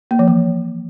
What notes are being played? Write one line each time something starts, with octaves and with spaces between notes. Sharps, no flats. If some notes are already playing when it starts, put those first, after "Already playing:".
A#3
F3
E3